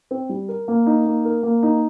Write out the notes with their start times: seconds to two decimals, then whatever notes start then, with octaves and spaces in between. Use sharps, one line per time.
0.11 C4
0.29 G3
0.49 A#4
0.68 A#3
0.86 D#4
1.06 A#3
1.25 A#4
1.43 A#3
1.63 D#4